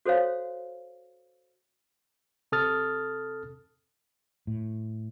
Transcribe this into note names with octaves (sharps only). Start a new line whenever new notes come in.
F#4 A4 C5 C#5 F5
C3 A4 D#6 F6 A6
A2